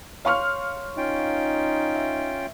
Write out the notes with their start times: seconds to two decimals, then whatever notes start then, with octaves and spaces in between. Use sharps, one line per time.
0.25 C#5 F5 C6 C#6 F6
0.97 C#4 D#4 F4 G5
1.96 E5